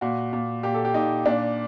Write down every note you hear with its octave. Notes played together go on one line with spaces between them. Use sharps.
A#2 F#4
A#2
A#2 G4
A4
G4
A#2 D#4
A#2 D4